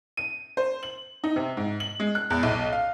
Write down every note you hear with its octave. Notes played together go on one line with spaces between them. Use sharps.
D#7
C5
F#7
D#4
C3
G#2
F#7
G#3
F#6
E2
B1
F5